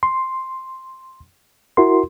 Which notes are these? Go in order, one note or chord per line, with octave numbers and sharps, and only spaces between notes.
C6
E4 F#4 A#4 C6